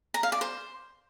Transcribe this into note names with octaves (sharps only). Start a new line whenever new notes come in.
A#5
F5
D5
C5